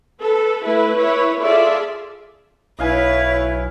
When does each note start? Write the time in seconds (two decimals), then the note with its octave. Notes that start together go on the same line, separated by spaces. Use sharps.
0.22 A4 B4
0.66 A3 E4 B4
0.99 E4 B4 C#5
1.42 F4 G#4 A4 D5 E5
2.79 B1 E4 B4 C#5 D#5 F5 G#5